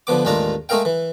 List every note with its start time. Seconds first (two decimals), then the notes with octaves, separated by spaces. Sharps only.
0.07 D3 F3 B3 D6
0.25 A1 D#2 G#3 D4 F4 A#5
0.69 G#3 A3 G#4 A#4 F5 G5
0.85 E3